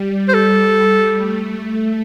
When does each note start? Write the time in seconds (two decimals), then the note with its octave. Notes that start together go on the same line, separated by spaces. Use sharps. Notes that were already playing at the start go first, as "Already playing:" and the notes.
Already playing: G3
0.28 C5
0.34 A4
1.17 A3